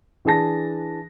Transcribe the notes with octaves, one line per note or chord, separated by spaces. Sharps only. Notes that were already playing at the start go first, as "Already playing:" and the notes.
E3 D4 G#4 A5 A#6